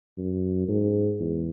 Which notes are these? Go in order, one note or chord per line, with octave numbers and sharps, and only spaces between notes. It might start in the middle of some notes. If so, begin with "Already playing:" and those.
F#2
G#2
E2